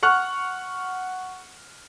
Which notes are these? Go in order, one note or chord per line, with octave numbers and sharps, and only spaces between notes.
F#5 C#6 F6 F#6